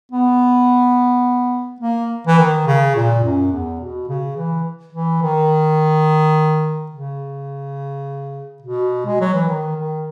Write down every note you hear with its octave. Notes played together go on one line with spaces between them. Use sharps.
B3
A#3
E3
D#3
C#3
A#2
F#2
E2
B2
C#3
E3
E3
D#3
C#3
B2
G#3
F#3
E3
D#3
D#3